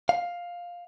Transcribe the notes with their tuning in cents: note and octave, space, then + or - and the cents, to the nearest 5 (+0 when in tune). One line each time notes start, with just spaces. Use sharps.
F5 +5